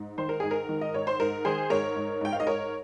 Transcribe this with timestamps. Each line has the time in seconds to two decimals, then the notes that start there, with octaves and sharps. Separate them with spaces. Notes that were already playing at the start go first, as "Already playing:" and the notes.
Already playing: G#2
0.18 D#3 C5
0.29 A#4
0.40 G#2 G#4
0.51 A#4
0.69 D#3
0.81 D#5
0.94 G#2 C#5
1.07 C5
1.20 G#2 A#4
1.45 D#3 G#4 C5
1.70 G#2 A#4 C#5
1.96 G#2
2.21 G#2 G5
2.32 F5
2.40 D#5
2.47 G#2 A#4 C#5